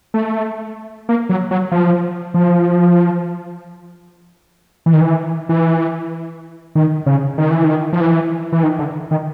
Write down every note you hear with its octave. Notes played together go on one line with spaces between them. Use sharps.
A3
A#3
F#3
F#3
F3
F3
E3
D#3
E3
E3
D#3
C#3
D#3
E3
D#3
F3
E3
E3
D#3
D3
D#3